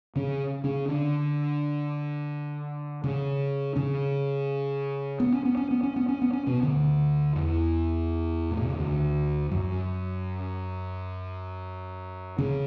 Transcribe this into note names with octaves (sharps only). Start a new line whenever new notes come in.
C#3 C#4
C#3 C#4
D3 D4
C#3 C#4
C#3 C#4
B3
C#4
B3
C#4
B3
C#4
B3
C#4
B3
C#4
B2 B3
D2 D3
E2 E3
A2
B2
C#3
D2 D3
F#2 F#3
C#3 C#4